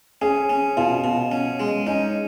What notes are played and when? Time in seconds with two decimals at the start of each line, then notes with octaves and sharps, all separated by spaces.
0.22 C#4 G#4
0.50 C#4
0.77 B2 F4
1.04 B2
1.32 C#4
1.60 G#3
1.86 C#4 D#4